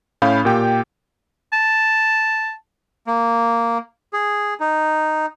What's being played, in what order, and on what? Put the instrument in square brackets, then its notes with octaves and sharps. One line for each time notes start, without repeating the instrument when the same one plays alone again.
[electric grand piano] A2 C#4 F5 B5 G6
A#2 A#3 G4 G5
[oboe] A5
[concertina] A#3
G#4
D#4